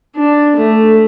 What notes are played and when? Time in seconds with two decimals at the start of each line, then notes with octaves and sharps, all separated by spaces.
0.15 D4
0.55 A3